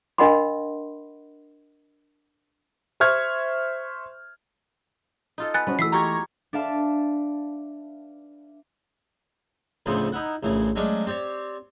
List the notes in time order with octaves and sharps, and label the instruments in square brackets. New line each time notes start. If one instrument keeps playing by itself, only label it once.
[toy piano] D4 A#4 D#5 F#5 B5 C6
[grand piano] C5 E5 C#6 F6 G#6
[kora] D#4 F4 A4
[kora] B3 [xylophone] G#5 F#6 A6
[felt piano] G3 C#4 C5 [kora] B3 F#4
[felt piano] E3 A3 [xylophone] E6 B6 C7
[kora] G#3 F4 G4 [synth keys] A#5 C#6 G#6
[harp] D4 B4 D5 E5 F5 A5
[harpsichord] D2 A2 C#3 F3 B3 C4
D#4 E4 F#5
A#1 A2 C#3 E3
F#3 G#3 A3 C#4 D4
C4 G4 C#5 D5